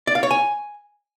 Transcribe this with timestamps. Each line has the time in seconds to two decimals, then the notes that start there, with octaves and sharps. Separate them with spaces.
0.07 D5
0.15 F5
0.23 C#5
0.31 G#5